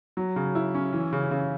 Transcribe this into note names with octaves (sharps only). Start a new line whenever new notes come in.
F#3
C#3
E4
C#4
E3
C#3
C#3